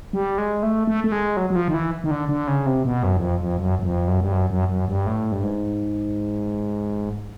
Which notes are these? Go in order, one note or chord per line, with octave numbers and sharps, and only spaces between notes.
G3
G#3
A3
A3
A3
G#3
F#3
F#3
F3
D#3
E3
D#3
D3
D3
C#3
C3
B2
F#2
E2
F2
F2
F#2
F#2
F2
F#2
G2
F#2
F#2
F#2
G2
A2
G2
G#2